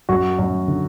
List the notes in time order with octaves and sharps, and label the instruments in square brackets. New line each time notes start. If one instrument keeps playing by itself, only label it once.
[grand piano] F#2 F#4
F#2
D3